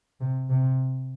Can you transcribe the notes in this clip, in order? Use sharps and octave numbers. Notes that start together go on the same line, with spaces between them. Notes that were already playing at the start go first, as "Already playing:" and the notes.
C3
C3